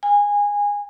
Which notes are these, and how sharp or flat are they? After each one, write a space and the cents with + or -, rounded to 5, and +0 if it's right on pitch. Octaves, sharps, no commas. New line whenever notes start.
G#5 -20